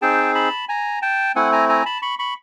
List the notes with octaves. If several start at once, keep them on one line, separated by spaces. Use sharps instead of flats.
C4 D#4 G#4 G5 A5
A5 B5
G#5 A#5
G5 A5
A3 C4 E4 F#5 G#5
G#5 A#5
G#5 A#5
A5 B5
B5 C#6
B5 C#6